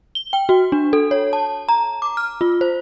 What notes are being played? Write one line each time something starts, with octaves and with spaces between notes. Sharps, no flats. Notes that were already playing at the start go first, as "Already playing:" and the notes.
G7
G5
F#4
D4
A4
C#5
A5
A#5
D6
F6
F4
C5